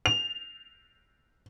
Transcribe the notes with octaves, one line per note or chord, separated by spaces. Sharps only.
F7